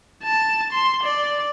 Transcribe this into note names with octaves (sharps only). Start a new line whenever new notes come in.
A5
C6
D5